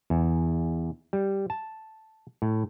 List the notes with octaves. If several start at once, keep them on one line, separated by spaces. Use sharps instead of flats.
E2
G3
A5
A2